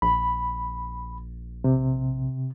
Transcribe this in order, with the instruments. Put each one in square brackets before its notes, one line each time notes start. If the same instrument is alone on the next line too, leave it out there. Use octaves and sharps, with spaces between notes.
[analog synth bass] A#1 [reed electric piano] B5
[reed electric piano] C3